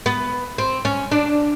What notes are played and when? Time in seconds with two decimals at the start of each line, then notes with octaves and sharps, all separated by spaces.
0.06 B3
0.58 C4
0.85 C#4
1.12 D4